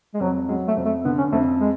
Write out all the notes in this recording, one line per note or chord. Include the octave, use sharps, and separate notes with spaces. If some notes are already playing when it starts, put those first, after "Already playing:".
G#3
F2 F#3
F#3 G#3
A3
F2
A3
D3 B3
C#4
F2 A3
G#3